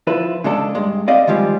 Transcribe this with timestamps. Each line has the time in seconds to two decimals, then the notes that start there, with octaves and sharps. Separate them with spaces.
0.07 F3 E4 B4
0.44 C#3 G#3 D4 A4
0.75 G2 G#3
1.07 C4 D5 D#5 F5
1.27 D#3 F3 G3 G#3